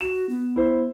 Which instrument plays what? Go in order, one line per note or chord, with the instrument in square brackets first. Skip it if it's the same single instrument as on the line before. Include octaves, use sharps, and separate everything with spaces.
[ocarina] F#4 [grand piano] E7
[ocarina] B3
[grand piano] E4 C5